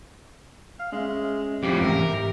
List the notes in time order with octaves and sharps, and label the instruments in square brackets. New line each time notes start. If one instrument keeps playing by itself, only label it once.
[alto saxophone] F5
[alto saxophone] G#3 [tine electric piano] C#4 E5
[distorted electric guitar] F2 A2 [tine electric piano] G#3 C#4 [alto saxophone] G4
[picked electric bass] G#2 E3 [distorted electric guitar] A#4 [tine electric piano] E5